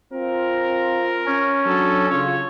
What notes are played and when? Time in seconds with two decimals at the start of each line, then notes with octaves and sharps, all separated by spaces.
0.14 C4 F4 A#4
1.26 C#4
1.66 F#3 D4 A4
2.10 C#3 F4 C#5